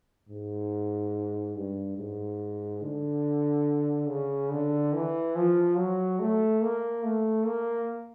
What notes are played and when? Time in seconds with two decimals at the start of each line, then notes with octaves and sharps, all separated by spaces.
0.29 G#2
1.56 G2
1.98 G#2
2.82 D3
4.08 C#3
4.51 D3
4.93 E3
5.35 F3
5.77 F#3
6.20 A3
6.62 A#3
7.04 A3
7.45 A#3